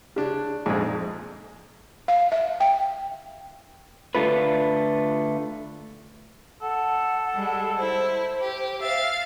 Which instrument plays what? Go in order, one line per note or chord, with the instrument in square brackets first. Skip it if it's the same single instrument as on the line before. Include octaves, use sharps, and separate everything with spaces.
[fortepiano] C#3 D4
[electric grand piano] A#1 G#4 [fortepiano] F2 G#2
[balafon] F5
E5
G5
[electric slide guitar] D3 A3 F4 B4
[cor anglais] A4 [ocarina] F#5
[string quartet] G3 G#3
[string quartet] E4 [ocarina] C5
[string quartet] G4
[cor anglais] E5 [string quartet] F5 A6